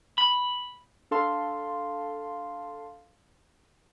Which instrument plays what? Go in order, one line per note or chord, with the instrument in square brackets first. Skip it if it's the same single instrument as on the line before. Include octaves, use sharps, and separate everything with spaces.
[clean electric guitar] B5
[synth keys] D4 A4 F5 A5 C6